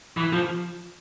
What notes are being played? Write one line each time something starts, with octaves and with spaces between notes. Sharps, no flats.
E3
F3